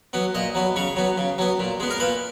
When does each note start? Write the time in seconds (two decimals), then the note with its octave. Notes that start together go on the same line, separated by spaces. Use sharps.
0.13 F#3 B3
0.35 A#2 D#5
0.55 F#3 B3
0.76 C#3 C#5
0.96 F#3 B3
1.18 C#3
1.38 F#3 B3
1.60 A#2
1.80 G#3 B3
1.90 A#4
2.00 A#2 B4